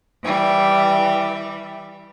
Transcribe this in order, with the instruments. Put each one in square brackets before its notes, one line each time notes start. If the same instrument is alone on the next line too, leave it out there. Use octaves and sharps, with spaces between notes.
[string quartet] E3 G3